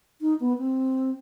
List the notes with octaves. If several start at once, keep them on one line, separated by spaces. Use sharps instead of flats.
D#4
B3
C4